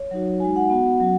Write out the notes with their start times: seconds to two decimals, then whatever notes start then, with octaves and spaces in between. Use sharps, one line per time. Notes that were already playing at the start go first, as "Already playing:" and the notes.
Already playing: C#5
0.11 F#3 D#4 F#4
0.40 G#3 D#4 F#4 G#5
0.56 F#5
0.70 B3 F#4
1.00 F#3 C#4 F#4